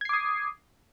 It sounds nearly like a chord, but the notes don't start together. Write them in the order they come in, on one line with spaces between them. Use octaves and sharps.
G#6 C7 D6 D#6